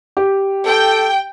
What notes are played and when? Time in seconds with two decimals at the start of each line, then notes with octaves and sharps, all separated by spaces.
0.17 G4
0.66 A4 G5